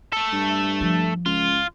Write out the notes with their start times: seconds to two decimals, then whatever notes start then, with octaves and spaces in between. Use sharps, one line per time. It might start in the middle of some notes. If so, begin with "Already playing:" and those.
0.12 A3 A4
0.33 G2
0.81 F3
1.26 C#2 F4